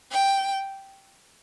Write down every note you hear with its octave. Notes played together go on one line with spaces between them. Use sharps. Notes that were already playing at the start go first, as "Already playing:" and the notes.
G5